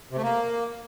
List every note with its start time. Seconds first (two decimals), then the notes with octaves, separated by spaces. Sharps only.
0.11 C3
0.17 A3
0.23 A#3